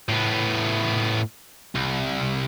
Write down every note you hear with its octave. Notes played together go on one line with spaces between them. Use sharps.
A2 B3
C2